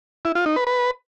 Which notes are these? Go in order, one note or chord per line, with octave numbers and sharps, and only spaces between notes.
E4
F4
D#4
B4
B4